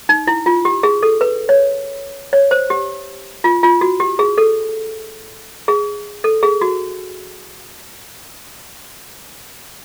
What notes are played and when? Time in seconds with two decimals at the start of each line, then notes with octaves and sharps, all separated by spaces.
0.09 D#4
0.27 E4
0.46 F4
0.65 G4
0.83 G#4
1.03 A4
1.21 B4
1.49 C#5
2.33 C#5
2.51 C5
2.70 G4
3.44 F4
3.63 F4
3.81 F#4
4.00 G4
4.19 G#4
4.38 A4
5.68 G#4
6.24 A4
6.43 G#4
6.61 F#4